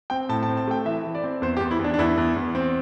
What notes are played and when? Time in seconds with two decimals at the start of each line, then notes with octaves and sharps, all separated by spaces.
0.10 C4 G5
0.29 A2 A5
0.43 A5
0.48 C4
0.57 A5
0.67 A3 G5
0.85 E3 E5
1.04 E3
1.15 D5
1.24 C4
1.42 E2 C5
1.57 G4
1.61 E2
1.71 E4
1.79 E2 D4
1.94 D4
1.99 E2 E4
2.17 E2
2.36 E2
2.55 C4